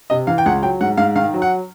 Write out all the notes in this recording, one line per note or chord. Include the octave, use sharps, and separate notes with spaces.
C3 D#5
E3 F5
G5
C#2 F#5
F#3 G5
G#2 F#5
G#2 F5
D#3 F5
F#3
F#5